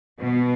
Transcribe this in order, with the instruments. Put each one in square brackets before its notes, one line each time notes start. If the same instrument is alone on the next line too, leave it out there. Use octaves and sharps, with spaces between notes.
[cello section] B2